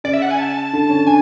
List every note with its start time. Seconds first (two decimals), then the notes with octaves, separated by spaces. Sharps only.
0.04 C#3 D5
0.13 E5
0.22 F#5
0.31 G#5
0.39 A5
0.73 D3
0.89 C#4
1.06 D4 G#5